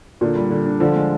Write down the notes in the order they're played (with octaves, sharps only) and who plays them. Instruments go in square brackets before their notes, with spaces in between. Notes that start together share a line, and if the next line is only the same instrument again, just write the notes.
[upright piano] A#2 [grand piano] D3
[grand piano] G3
D3
D4
[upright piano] D3 [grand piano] F3
[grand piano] G#3